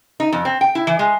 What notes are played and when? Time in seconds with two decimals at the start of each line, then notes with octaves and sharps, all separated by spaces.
0.20 D#4
0.32 F2
0.45 C4
0.61 G5
0.75 E4
0.87 E3
0.99 G#3